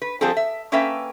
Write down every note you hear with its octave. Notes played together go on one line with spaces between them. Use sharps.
B4
F3 G3 C4 F4 G#4 A4
E5
A#3 C#4 A4 B4 E5 G5